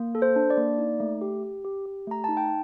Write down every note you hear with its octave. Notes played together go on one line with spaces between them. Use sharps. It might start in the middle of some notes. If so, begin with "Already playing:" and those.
Already playing: A#3
A4
C5
D4
D5
A#3
D#4
A3
G4
G4
G4
G4
A3 A#5
D#4 A5
G5